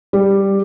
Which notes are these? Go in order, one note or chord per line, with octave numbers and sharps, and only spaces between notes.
G3